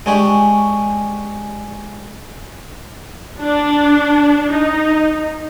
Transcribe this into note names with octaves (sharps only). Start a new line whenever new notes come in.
G#3 D4 G4 G#5 C#6
D4
D#4